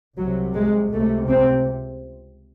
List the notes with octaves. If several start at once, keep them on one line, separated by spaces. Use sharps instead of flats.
C2 C3 F#3
G#3
C#2 C3 A3
C4